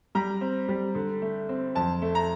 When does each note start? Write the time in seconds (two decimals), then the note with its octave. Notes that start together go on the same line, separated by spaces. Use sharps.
0.15 G3 A#5
0.41 C4
0.68 G3
0.95 D3
1.22 A3
1.49 C4
1.75 F2 A5
2.02 A3
2.15 A#5